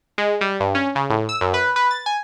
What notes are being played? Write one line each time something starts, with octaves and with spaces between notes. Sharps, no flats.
G#3
G3
G2
C#4
C#3
A2
E6
F#2
B4
B4
A6
G#5